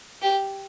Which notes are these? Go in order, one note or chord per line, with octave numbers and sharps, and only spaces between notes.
G4